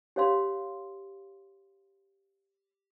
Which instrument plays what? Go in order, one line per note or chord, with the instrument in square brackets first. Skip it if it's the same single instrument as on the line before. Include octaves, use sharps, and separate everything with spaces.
[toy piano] G4 C#5 F5 C6